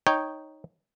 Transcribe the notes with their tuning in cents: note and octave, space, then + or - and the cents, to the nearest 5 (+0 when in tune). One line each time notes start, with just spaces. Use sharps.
D#4 +0 C#5 -10 G5 +0